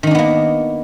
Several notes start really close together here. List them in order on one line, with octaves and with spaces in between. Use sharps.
D#3 D#4 D4 B3 A#3